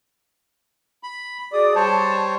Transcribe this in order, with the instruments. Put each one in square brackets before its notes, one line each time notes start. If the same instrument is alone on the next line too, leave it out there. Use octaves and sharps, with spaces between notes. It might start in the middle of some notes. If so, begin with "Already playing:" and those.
[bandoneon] B5
[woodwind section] F#4 G#4 D5 [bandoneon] D#6
[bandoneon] G3 C5 C#5 [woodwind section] A5